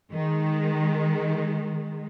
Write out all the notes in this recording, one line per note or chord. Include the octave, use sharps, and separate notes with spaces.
D#3 G#3